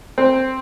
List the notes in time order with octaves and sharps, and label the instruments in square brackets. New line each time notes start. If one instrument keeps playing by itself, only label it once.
[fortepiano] C4